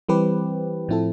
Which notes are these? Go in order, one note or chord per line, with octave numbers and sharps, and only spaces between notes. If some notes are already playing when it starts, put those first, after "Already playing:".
E3 G3 C4 G4 B4
A2 F3 C4 E4 A4